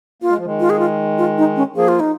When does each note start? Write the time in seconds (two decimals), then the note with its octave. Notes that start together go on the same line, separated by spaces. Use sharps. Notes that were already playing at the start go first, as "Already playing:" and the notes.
0.22 A#3 F4
0.30 G#3
0.38 F3
0.45 D#3 G#3
0.60 F4
0.70 G#4
0.79 F4
1.18 F4
1.38 D#4
1.56 C#4
1.76 F3 A#3 G#4
1.88 F4
2.00 D#4